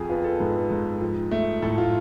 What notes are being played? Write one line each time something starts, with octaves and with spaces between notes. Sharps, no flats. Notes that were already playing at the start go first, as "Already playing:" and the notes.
Already playing: F2 F3 G#4
B3 F4
A4
G#2 B4
G#2
F3
A3
A2 A4
F4